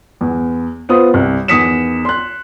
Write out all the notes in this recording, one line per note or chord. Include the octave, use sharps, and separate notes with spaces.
E2
B3 F4 C5 D#6
C2
E2 D#3 D#6 B6 C#7 E7
C6 F#6